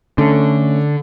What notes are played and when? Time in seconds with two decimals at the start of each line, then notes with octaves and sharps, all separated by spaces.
0.18 D3 A3 C#4 A4